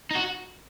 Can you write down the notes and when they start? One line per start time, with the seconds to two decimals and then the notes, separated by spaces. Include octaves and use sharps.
0.11 D#4
0.15 F#4